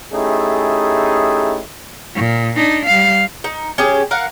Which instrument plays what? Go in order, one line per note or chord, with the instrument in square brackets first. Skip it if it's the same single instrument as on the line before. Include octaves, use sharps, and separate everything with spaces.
[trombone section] A3 C#4 D#4 E4 G4 G#4
[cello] A#2
D4 D#4
G3 F5
[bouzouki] D#4
C#4 G4 G#4
A#4 F5 F#5